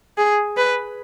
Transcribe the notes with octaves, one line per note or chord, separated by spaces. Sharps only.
G#4
B4